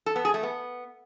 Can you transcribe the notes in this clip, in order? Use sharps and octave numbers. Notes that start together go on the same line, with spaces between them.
A4
B3
G#4
A3
B3